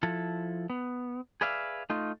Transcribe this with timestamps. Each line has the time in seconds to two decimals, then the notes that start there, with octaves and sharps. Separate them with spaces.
0.03 F3 E4 A4
0.70 B3
1.41 G#4 B4 D5 E5 F5
1.90 A3 D#4 F4